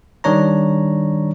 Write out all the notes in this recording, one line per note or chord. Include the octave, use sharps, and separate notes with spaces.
D#3 G3 D4 C#5 A#5